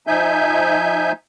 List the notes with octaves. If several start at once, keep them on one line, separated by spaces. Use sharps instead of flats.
F3 D#4 E5 G#5 G6